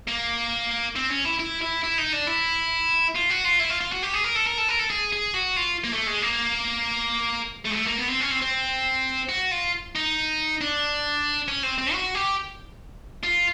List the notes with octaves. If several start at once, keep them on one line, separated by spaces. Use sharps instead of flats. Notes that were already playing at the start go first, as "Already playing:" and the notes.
A#3
C4
C#4
E4
E4
E4
E4
D#4
D4
E4
F4
F#4
F4
E4
F4
F4
F#4
G4
G#4
A#4
A4
A#4
A4
A#4
A4
G#4
G#4
F#4
F4
A#3
A3
G#3
A#3
A3
G#3
A3
A#3
B3
C4
C#4
C4
C4
F#4
F4
D#4
D4
C#4
C4
C4
F#4
G4
F4